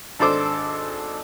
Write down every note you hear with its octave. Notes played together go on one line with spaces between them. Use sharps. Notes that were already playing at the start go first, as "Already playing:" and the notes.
G#1 D4 A4 C5 D6